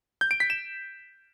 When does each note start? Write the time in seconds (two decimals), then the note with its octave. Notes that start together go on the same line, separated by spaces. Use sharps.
0.21 G6
0.31 D7
0.40 B6
0.50 E7